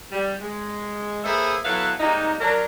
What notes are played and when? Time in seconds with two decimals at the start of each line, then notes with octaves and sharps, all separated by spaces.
0.12 G3
0.41 G#3
1.24 A#3 G#4 A4 B4 C5 E5
1.65 F#3 B3 E4 A4 B4 F5
2.00 C3 G3 G#3 A#3 D#4
2.41 F#3 D4 A#4